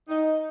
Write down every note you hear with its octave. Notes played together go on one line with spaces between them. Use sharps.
D#4